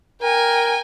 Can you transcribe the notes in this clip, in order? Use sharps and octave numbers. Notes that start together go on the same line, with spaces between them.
A#4 G5 G#5